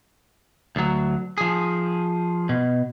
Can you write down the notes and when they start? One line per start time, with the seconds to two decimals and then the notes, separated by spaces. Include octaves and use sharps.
0.76 D2 F#3
1.38 F3 G#4
2.49 B2